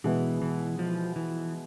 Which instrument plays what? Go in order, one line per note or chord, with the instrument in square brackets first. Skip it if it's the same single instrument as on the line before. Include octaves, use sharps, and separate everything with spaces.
[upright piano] B2 G#3 B3 E4 [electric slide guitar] E3
[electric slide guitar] E3
F3
E3